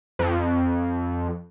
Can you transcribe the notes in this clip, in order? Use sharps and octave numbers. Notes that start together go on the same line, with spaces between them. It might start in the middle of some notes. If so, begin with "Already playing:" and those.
F2